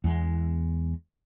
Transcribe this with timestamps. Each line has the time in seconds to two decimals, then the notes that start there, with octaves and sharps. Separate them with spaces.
0.04 E2 G#3